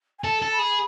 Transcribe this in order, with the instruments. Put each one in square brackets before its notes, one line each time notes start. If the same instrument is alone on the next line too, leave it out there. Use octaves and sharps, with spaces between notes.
[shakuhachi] G#5
[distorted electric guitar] A4 [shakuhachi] A5
[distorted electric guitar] A4
[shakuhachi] B5
[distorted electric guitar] G#4